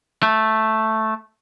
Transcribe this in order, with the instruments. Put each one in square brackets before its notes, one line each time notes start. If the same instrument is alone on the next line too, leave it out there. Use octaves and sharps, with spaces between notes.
[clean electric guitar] A3